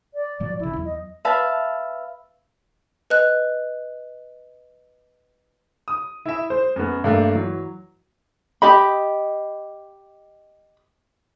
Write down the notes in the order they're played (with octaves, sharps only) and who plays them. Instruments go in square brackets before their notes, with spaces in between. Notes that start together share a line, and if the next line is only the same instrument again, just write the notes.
[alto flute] D5
[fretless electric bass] G#2 F3 F#3
[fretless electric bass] A#1 C#3 [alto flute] E4
[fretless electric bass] E2 F#3
[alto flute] D#5
[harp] B4 E5 F5 A5
[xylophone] B4 D#5 F#6
[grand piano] D#6
E4 E5
C5
F#2 B3
G2 A3 A#3
E3 F#3
[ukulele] G4 D#5 B5